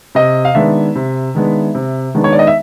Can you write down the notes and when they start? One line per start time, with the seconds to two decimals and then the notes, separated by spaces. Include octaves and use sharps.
0.15 C3 D#5
0.45 F5
0.55 D#3 G#3 B3 D4 E5
0.95 C3
1.35 D#3 G#3 B3 D4
1.75 C3
2.14 D#3 G#3 B3 D4
2.24 C#5
2.33 D5
2.39 D#5
2.47 E5